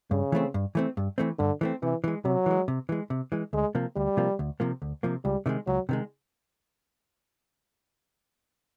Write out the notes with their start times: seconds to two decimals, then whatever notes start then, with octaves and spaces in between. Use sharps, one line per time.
0.11 G2 C#3
0.32 E3 A3 C4
0.54 G2
0.75 E3 A3 C4
0.97 G2
1.18 E3 A3 C4
1.39 G2 D3
1.61 E3 A3 C4
1.82 C3 E3
2.04 E3 G#3
2.25 C3 F#3
2.46 E3 G#3
2.68 C3
2.89 E3 G#3
3.10 C3
3.32 E3 G#3
3.53 D2 G#3
3.75 C3 F3 A#3
3.96 D2 G3
4.17 C3 F3 A#3
4.39 D2
4.60 C3 F3 A#3
4.82 D2
5.03 C3 F3 A#3
5.24 C#2 G3
5.46 C3 D#3 G#3
5.67 C#2 F#3
5.89 C3 D#3 G#3